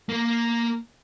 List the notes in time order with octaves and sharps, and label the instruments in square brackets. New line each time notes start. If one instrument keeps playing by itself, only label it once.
[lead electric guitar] A#3 A#4